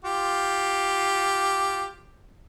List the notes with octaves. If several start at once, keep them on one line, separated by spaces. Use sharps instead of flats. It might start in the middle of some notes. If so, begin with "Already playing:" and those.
F4 G4